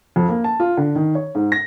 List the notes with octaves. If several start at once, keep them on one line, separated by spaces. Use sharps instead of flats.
F2
A#3
A5
F4
D3
D#3
C#5
G#2
A#6